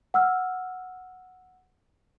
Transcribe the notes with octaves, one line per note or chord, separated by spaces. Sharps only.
F#5 E6 F6